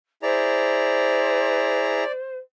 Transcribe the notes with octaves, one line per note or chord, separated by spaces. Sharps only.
E4 G#4 C5 D5 A#5